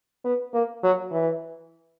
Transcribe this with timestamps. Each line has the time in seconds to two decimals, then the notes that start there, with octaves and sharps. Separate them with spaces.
0.25 B3
0.54 A#3
0.83 F#3
1.11 E3